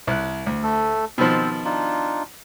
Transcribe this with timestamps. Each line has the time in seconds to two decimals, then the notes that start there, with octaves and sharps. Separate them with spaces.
0.07 C2 F#6
0.46 D2
0.63 A3 A4
1.18 B2 D#3 F3 C4
1.65 D4 D#4 F4